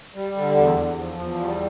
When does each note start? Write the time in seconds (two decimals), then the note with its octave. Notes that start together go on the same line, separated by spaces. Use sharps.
0.15 G3
0.36 D3
0.57 E2
0.78 E2
0.99 F3
1.19 E2
1.41 G3